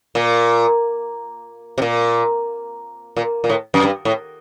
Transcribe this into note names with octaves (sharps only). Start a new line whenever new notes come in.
A#2
C3
A#2
A#2
A#2
A2
F#2
G2
A2